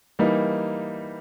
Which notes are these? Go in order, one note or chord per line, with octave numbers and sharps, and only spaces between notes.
E3 G3 A#3 D#4